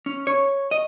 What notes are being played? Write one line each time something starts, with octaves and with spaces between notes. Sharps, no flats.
C#4
C#5
D#5